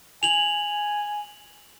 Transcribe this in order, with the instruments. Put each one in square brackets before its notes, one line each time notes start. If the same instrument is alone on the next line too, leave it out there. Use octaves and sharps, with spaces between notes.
[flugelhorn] G#5 [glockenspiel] F7 F#7